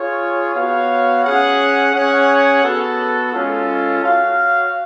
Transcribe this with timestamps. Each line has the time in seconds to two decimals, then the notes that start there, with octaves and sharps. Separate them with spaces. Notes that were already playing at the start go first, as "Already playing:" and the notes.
Already playing: F4 G#4 C#5
0.54 B3 F#4 C#5 F5
1.24 C#4 G#4 C#5 F#5
1.94 C#4 G#4 C#5 F#5
2.63 B3 F#4 A4
3.32 G#3 C#4 F4 A4
4.02 F#4 C#5 F5